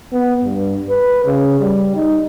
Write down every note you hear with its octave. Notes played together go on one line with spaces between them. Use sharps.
B3
G2
B4
C#3
G3
D#4